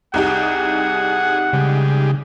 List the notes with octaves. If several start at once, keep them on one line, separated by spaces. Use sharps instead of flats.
C2 D#4 G4 G#4 F#5
C#3 G3 G#3